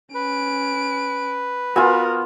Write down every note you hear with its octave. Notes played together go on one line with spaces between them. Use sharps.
C#4 B4 D7
B3 F4 F#4 A#4 G#5 E6